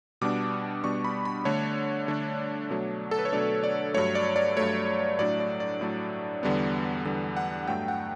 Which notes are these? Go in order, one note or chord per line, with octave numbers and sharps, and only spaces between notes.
B2 G3 B3 D4 D6
B2 G3 B3 D4 C#6
B5
B5
D3 A3 D4 C#5
D3 A3 D4
B2 F#3 A3 D4
A4
B4
C#5
B2 F#3 A3 D4 D5
D5
G2 F#3 A3 C#5
D5
D5
G2 F#3 A3 C#5
A2 F#3 A3 D4 D5
D5
D5
A2 F#3 A3 D4
E2 D3 G3 B3
E2 D3 G3 B3
F#5
G2 F#3 A3 G5
F#5